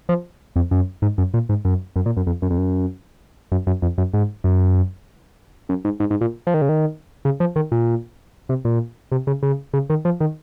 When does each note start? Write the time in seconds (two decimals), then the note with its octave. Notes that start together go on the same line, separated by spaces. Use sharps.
0.09 F3
0.56 F2
0.71 F#2
1.02 G#2
1.18 F#2
1.34 A#2
1.49 G#2
1.65 F#2
1.96 F#2
2.06 A#2
2.17 F#2
2.27 F2
2.42 F#2
2.50 F2
2.58 F#2
3.52 F#2
3.67 F#2
3.82 F2
3.98 F#2
4.14 G#2
4.44 F#2
5.69 F#2
5.85 G#2
6.00 G#2
6.11 G#2
6.21 A#2
6.47 F3
6.54 D#3
6.62 C#3
6.69 D#3
7.25 C#3
7.40 F3
7.56 D#3
7.72 A#2
8.49 C3
8.65 A#2
9.12 C3
9.27 C#3
9.43 C#3
9.74 C#3
9.90 D#3
10.05 F3
10.20 D#3